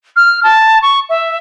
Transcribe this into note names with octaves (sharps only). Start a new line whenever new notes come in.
F6
A5
C#6
E5